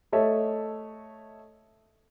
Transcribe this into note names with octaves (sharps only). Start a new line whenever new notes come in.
A3 A4 C#5 D#5 E5 A5